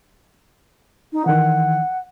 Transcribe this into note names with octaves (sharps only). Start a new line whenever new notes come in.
D#4
D#3 E3 F#5